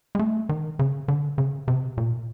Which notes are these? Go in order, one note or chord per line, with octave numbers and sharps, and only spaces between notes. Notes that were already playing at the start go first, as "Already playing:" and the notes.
G#3
A3
D#3
C#3
D3
C#3
C3
A#2